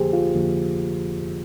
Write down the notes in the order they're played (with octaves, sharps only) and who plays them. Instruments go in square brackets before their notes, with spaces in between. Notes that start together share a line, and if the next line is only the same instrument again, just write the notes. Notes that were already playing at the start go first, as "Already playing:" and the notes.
Already playing: [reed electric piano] F2 D3 F3 A#3 G4 G#4 C5
F4
F2 D3 F3 A#3